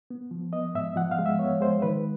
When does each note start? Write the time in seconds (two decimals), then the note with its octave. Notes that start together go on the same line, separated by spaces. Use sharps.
0.10 B3
0.31 F3
0.53 B3 D#5
0.75 G#2 E5
0.96 F3 F#5
1.11 F5
1.19 G#3
1.26 E5
1.39 B3 C#5
1.61 G#3 C5
1.82 D#3 B4